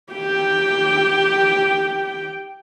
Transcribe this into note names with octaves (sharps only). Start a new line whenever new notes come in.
G4 G5